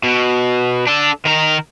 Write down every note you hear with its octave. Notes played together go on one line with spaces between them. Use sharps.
B2
D4 A4
D#3 A#4